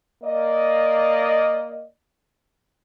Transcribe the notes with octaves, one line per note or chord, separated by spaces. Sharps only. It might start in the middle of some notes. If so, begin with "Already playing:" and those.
A#3 D5 D#5